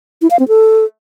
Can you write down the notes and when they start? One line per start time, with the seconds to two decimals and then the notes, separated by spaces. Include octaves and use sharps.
0.22 E4
0.31 F5
0.39 C4
0.48 A4